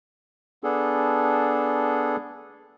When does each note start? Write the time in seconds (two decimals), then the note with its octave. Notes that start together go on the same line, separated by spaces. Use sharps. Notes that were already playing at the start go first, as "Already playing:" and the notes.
0.64 B3 D4 G#4 A4